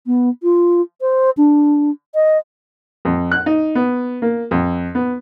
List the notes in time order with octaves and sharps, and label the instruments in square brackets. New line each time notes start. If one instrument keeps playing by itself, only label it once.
[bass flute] B3
F4
C5
D4
D#5
[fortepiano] F2
F#6
D#4
B3
A#3
F2
B3